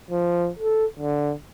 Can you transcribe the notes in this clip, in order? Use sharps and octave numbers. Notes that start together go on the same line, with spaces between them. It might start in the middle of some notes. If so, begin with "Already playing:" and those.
F3
A4
D3